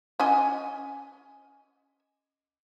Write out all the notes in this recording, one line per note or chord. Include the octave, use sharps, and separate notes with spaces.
C#4 D#5 G#5